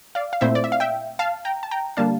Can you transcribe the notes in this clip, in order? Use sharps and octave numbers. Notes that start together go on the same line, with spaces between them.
D5 F5
F5
A#2 A3 C4 E4 C5 E5
D5
E5
F5
E5 G5
F5 A5
G5 A#5
A5
G5 A#5
D3 G3 A#3 D4 F5 A5